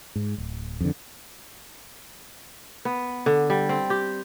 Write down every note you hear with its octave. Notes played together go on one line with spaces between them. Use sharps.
G#2
D1
F2 D3
B3
D3
G3
C4
G4